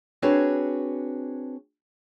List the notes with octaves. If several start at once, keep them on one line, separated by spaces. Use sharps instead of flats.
C4 D4 F#4 G#4 B4 C#5